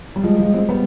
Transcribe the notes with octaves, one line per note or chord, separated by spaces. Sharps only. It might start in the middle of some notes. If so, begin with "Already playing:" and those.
G3
F3 G#3
F3 G#3
G#3 C4
G3 B3